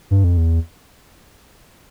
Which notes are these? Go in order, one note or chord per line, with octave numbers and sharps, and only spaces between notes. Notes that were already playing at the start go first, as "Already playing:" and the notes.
G2
F2
E2